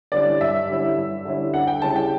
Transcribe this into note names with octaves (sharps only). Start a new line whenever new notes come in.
D3 G3 C#4 E4 D5
G2 E5
D3 G3 C#4 E4
G2
D3 G3 C#4 E4
D2 F#5
G5
C#3 G3 C#4 E4 A5
G5